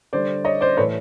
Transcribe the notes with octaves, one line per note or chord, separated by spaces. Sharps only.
D3 G3 C5 D5
C#5 D#5
C5 D5
A2 E3 A3 B4 C#5